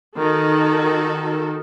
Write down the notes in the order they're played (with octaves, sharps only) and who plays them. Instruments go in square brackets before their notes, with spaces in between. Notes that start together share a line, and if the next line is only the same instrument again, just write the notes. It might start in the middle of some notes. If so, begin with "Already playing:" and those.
[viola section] D#3 F#4 A4